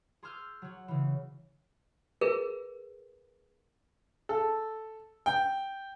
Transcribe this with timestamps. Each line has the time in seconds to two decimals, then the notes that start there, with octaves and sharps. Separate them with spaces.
0.23 G#4 C6 D6 E6 F6 G6
0.62 F#3 F#4
0.88 C#3 E3
2.21 G#4 A#4 B4
4.29 A4
5.26 G5